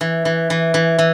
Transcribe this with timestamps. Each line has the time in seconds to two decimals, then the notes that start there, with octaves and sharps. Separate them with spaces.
0.01 E3
0.25 E3
0.50 E3
0.74 E3
0.98 E3